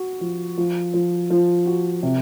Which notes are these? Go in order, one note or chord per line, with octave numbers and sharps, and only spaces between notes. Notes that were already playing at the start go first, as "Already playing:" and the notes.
Already playing: F#4
F3
F3
F3
F3
F#4
C3